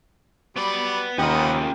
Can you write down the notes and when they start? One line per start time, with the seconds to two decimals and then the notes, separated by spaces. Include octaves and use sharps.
0.56 F#3 G3 B3 D5 B5
1.18 D#2 C#4 F4 G4 A#4 B4 D#5 F#5